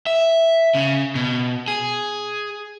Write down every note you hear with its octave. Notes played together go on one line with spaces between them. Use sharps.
E5
C#3
B2
G#4